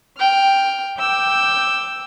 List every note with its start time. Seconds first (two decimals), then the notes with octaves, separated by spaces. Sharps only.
0.16 G5 F6
0.98 G5 D6 E6 G6